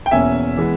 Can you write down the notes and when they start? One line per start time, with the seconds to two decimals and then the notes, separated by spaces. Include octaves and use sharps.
0.06 G5
0.11 E2 B2 A#3 C#4 E5 G#5
0.57 E3 G#3 B3